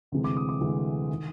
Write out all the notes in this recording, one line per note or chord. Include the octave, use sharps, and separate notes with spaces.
D2 C3 E3 G#3
D6
D#6
D6
D2 C3 E3 G#3
D#3